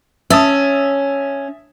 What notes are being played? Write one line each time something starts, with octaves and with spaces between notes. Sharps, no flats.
C#4 E5 A5 D#6